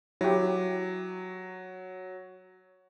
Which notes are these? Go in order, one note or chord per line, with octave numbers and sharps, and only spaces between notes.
F#3 E4 G4